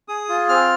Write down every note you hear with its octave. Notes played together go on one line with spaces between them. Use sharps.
G#4 D#6
F4
C4 F6